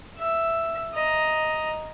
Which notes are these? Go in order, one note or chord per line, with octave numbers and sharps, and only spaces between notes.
E5
D#5 A#5